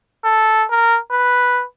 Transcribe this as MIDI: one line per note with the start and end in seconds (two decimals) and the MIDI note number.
0.25 0.64 69
0.70 0.99 70
1.12 1.64 71